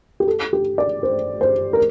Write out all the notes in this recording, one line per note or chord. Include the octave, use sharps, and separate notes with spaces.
G4
A4
G4
D5
C5
C5
A#4